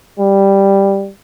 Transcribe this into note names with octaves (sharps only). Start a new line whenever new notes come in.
G3